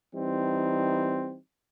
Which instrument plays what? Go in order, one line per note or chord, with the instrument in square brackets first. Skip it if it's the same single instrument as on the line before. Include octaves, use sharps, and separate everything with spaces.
[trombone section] E3 G3 C4 D#4